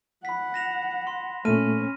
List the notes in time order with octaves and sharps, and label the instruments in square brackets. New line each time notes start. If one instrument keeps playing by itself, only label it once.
[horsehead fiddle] F#5 [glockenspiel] B5 B6
[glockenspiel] A#6 E7 F7
C6
[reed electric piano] A#2 A3 [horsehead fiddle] C#4 [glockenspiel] F6 D#7